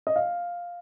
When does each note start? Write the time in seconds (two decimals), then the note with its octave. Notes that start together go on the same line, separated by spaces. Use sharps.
0.07 D#5
0.16 F5